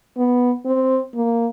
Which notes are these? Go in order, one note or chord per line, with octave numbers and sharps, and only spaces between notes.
B3
C4
A#3